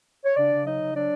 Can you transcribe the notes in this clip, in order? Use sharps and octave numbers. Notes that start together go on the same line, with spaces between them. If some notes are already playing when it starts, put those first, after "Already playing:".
C#5
C#3 D4 D5
C#3
F#3 D#4 D#5
C#3
F#3 D4 D5